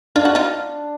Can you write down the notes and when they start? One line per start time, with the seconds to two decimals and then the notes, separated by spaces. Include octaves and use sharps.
0.16 D4 F4
0.25 F#4
0.35 D#4 F4